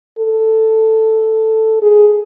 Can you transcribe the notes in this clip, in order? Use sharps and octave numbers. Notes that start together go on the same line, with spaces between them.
A4
G#4